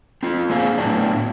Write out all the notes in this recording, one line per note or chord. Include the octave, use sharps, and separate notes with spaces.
C4 F4
A#3 C4 D4 G#4 F5
A2 F#3 B3 D4